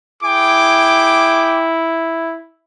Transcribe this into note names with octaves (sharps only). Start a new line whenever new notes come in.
E4 G#4 G5 D6